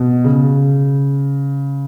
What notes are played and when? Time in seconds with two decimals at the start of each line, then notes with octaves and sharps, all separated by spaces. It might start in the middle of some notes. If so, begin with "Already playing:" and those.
Already playing: B2
0.24 C#3